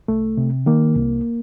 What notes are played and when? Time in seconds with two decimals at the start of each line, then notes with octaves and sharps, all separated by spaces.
0.08 C2 A3
0.37 C3
0.66 D#3 A#3
0.95 C2